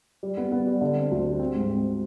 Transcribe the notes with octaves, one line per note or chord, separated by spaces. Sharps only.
G3
B3
B3
G3
D3
C4
D2
G3
C4
G#2
C4